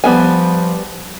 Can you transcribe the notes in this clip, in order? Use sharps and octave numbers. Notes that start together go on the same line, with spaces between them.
F3 G3 B3 G#5